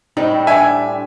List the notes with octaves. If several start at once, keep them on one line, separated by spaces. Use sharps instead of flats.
A2 G3 C4 D#4
D4 E5 G#5